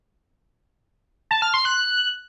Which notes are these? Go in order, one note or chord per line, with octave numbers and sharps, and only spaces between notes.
A5
F6
C6
F#6